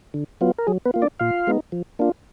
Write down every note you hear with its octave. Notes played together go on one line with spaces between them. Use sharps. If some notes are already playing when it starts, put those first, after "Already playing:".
D3
F#3 B3 F4
A#4
F#3 G#4
B3 B4
A#3 F4
D4 D5
A#2 F4 F5
G#3 B3 D#4
F3
A#3 D4 F4